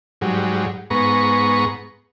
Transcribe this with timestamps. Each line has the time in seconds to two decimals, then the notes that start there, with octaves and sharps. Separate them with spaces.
0.21 G#2 F#3 G3
0.90 G#2 B3 A#5 C#6